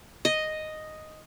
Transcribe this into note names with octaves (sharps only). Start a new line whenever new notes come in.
D#5